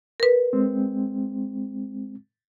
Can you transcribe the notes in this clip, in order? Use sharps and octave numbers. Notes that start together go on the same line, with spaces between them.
A#4 B4
G#3 C4